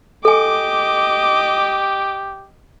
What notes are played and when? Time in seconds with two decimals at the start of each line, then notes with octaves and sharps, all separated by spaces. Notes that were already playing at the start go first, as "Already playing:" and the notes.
0.25 G4 A4 D#5 G#5 D6